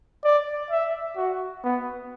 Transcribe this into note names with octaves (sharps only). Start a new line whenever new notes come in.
D5
E5
F#4
B3